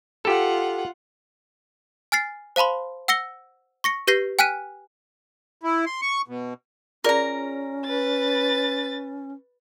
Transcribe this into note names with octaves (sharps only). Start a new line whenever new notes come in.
F4 G4 A4 F#5
G#5 F6 A6 C7
C5 F5 A5 B5 C6
F#5 E6 A#6 C#7 G7
C#6 A#6 C#7
G4 B4 G6 A#6 C7
G5 G#5 F6 F#6 B6 D#7
E4
C6
C#6
B2
C#4 F4 G#4 A#4 D5 A#5
B4 A6